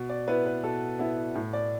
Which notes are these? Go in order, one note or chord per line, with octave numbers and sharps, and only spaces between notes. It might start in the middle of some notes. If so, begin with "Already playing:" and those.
Already playing: B2
D5
B3 E4 B4
B4
B2 A4
B3 E4
A2
D5